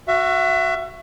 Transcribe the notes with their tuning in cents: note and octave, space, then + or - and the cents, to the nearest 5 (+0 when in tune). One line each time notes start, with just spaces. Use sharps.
F#4 -5 E5 +30